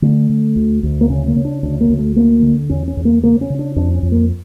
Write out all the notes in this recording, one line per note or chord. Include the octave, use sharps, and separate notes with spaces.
D3 A3
D3
D2
D2
A#3
C#3 C#4
A#3
C#3
D4
D2 D4
A#3
D2
A3
D3 A#3
D3
E2 C#4
C#4
E2
A#3
C#3 A#3
C#4
C#3
D4
F2 D4
C#4
F2
A#3